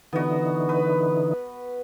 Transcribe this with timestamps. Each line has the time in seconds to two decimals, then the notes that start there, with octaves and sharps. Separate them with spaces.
0.13 D3 E3 B3 D#4 F#4
0.69 B4